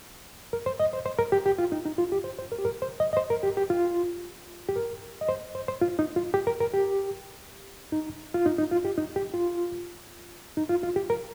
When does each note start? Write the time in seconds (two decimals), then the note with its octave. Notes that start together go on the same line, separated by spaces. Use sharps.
0.53 A#4
0.66 C5
0.80 D#5
0.93 C5
1.06 C5
1.19 A#4
1.32 G4
1.46 G4
1.58 F4
1.72 D#4
1.85 D#4
1.98 F4
2.12 G4
2.24 C5
2.38 C5
2.52 A#4
2.58 G4
2.65 A#4
2.82 C5
3.00 D#5
3.13 D#5
3.17 C5
3.30 A#4
3.43 G4
3.57 G4
3.70 F4
4.69 G4
4.76 A#4
5.21 D#5
5.29 C5
5.55 C5
5.68 C5
5.82 F4
5.99 D#4
6.16 F4
6.34 G4
6.47 A#4
6.60 A#4
6.74 G4
7.92 D#4
8.34 F4
8.46 D#4
8.58 D#4
8.71 F4
8.85 G4
8.98 D#4
9.16 G4
9.34 F4
10.57 D#4
10.69 F4
10.83 F4
10.96 G4
11.10 A#4